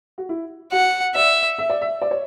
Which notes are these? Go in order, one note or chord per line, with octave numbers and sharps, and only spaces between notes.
F#4
E4
F#4 F#5
D5 E5
E5
D5
E5
D5
C#5